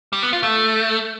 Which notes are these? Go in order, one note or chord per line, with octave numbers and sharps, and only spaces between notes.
G3
B3
F4
A3